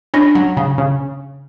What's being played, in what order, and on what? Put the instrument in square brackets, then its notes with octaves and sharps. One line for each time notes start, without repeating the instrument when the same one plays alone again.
[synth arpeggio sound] C#4 [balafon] D4
[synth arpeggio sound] F#3
C#3
C#3